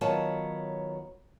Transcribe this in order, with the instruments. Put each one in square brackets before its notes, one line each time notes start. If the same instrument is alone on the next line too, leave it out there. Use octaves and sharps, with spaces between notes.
[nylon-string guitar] D#3 F#3 B3 F4 C#5 A5